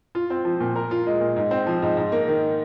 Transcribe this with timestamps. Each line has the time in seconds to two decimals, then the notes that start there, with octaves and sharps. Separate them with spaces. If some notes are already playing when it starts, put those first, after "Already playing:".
0.15 F4
0.30 C4
0.45 F3
0.60 A#2
0.76 A#4
0.91 F4
1.07 G#3
1.21 A#2
1.36 G#2
1.51 C4
1.67 F3
1.82 G#2
1.97 G#2
2.12 A#3
2.28 D#3